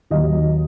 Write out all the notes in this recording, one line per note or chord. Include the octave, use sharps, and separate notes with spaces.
D#2 D#3 F#3 D#5